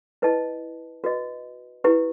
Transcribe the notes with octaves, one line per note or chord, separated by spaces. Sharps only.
E4 B4 D#5 A5
F#4 B4 D#5
E4 G4 B4